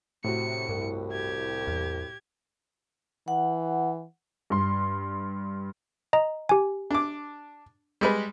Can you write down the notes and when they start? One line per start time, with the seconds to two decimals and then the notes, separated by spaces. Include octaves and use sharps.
0.24 A2 C3 F#4 C#7
0.69 C2 G2
1.12 G4 G#6
1.68 E2
3.28 E3 F#5
4.50 G2 C6
6.13 D#5 A#5
6.49 G4 G#5
6.91 D4 D6
8.01 G3 G#3 B4